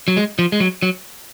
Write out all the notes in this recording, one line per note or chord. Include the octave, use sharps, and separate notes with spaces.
F#3
G#3
F3
G#3
F#3
F#3